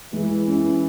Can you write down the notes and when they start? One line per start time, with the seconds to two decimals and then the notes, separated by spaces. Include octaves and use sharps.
0.13 E3 G#3
0.47 C#4